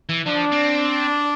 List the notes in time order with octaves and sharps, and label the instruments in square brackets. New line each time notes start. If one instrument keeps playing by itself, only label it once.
[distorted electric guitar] E3
[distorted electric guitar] F3 [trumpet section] D4
[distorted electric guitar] C4